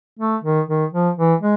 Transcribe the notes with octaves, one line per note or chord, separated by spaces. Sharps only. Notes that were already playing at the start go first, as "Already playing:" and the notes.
A3
D#3
D#3
F3
E3
G#3